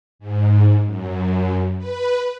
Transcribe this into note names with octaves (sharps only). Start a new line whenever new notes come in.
G#2
F#2
B4